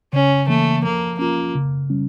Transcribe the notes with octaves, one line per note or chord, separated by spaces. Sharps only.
C#3 C#4
E3 A3 A#3
F3 A#3
A#3 C#4 F4
C#3
G3 C#4